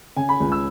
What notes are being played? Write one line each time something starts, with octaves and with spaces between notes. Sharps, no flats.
C#3 G#5
B5
C#2
E6